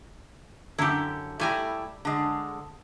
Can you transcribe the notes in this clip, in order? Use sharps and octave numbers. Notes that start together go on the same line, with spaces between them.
F#2 D3 E4 G4
G3 A3 E4 G4 G#5 A#5
D3 G#3